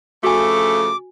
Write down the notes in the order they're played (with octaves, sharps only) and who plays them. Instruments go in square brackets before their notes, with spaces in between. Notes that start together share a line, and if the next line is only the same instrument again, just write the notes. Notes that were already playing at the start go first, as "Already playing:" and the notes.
[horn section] C#3 F3 A3 [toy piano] F#4 G#5 [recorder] D6